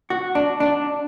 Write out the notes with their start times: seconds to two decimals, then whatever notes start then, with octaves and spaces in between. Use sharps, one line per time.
0.10 F#4
0.35 D4
0.60 D4